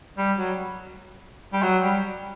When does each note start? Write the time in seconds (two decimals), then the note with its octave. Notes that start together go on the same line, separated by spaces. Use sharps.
0.18 G3
0.38 F#3
1.53 G3
1.63 F#3
1.83 G3